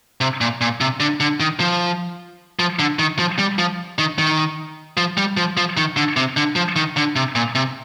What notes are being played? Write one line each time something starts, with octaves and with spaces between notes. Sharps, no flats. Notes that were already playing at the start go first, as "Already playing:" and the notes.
C3
A#2
A#2
C3
D3
D3
D#3
F3
F3
D3
D#3
F3
G3
F3
D#3
D#3
F3
G3
F3
F3
D#3
D3
C3
D3
F3
D#3
D3
C3
A#2
C3